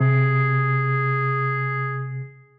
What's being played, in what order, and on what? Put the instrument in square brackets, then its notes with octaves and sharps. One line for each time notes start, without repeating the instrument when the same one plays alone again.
[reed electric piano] C3 [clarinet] G#4